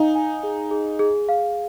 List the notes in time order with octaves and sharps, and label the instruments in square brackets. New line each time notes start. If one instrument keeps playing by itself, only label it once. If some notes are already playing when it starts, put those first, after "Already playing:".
Already playing: [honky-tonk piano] D#4 [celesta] F5 G#5
[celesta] G#5
G#4
G#4
G#4
F5